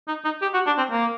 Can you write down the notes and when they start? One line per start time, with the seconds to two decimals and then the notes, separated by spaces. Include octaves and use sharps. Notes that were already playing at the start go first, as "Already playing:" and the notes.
0.08 D#4
0.25 D#4
0.42 G4
0.54 F#4
0.67 D4
0.78 C4
0.91 A#3